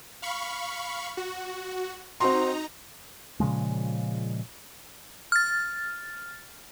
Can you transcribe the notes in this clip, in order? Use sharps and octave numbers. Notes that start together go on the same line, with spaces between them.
F5 B5 C#6
F#4
C4 D#4 F#4 A#5 C6
A#2 C#3 F3 G#3
F6 A6